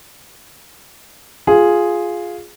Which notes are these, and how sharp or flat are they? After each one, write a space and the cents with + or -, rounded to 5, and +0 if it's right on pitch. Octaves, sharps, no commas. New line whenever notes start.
F4 +5 G#4 +0